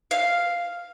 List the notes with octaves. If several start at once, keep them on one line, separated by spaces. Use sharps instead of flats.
F5